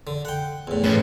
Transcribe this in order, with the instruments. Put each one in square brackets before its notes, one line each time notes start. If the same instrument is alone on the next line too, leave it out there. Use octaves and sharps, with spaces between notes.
[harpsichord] D3
F#5 G5
E2 A2
[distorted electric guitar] A2 C#4 [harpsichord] B4